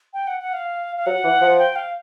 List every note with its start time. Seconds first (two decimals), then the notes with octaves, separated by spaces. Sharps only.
0.14 G5
0.27 F#5
0.40 F#5
0.53 F5
0.96 F5
1.06 F#3 F#5
1.24 E3
1.41 F3
1.59 G5
1.76 F5